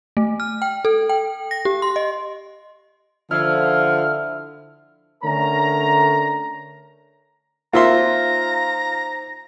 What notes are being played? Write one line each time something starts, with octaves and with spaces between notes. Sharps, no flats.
A3
F6
G5
A4
G5
A#6
G4
C6
D#5
D3 F3 E4 F6
D3 A3 C#4 A#4 A#5
A#3 D#4 F4 C5 E5 A#5 C6